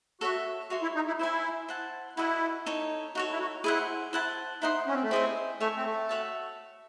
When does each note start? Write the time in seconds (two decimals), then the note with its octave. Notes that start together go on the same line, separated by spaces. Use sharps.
0.21 F#4 A4 C#5 E5
0.70 F#4 G#4 C#5 E5 C6
0.82 E4
0.95 D#4
1.07 E4
1.19 E4 C5 E5 G#5
1.68 C5 F#5 A5
2.17 E4 F#4 A4 D#5 F#5
2.66 D#4 A4 C#5
3.15 D#4 F#4 A4 C#5
3.32 E4
3.39 F#4
3.64 E4 G#4 C5 F#5
4.13 E4 C5 F#5 A5
4.62 D#4 E4 C5 F#5 C6
4.87 C#4
4.95 C4
5.03 A3
5.11 C4 E4 G#4 D#5 G#5
5.60 A3 C#5 E5 G#5
5.77 C4
5.85 A3
6.09 F#4 C#5 E5 A5